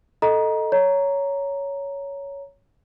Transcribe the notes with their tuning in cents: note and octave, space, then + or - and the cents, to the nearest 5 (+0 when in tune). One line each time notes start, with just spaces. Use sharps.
A4 +0 D#5 +0 A#5 +25
C#5 +10 A#5 +0